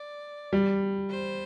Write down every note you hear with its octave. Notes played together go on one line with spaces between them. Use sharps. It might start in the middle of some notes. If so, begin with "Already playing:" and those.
Already playing: D5
G3
C5